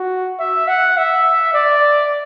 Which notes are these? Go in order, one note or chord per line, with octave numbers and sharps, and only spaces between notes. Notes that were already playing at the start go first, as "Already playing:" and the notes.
Already playing: F#4
E5
F#5
E5
D5